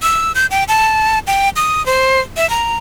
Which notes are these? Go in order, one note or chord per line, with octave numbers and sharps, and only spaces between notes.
E6
G6
G5
A5
G5
D#6
C5
E5
A#5